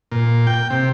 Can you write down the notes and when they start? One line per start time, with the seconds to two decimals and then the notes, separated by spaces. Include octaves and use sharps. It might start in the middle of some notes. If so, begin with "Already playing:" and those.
0.12 A#2
0.47 G5
0.70 C3